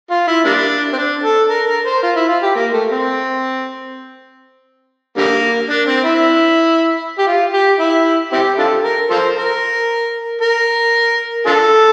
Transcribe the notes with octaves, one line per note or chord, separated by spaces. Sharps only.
F4
E4
G3 A#3 D4
C4
D4
A4
A#4
A#4
C5
F4
E4
F4
G4
A#3
A3
C4
D3 G3 A#3
D4
C4
E4
G4
F4
G4
E4
C4 E4 G4
D4 F4 A4
A#4
F4 A4 C5
A#4
A#4
D4 F4 A4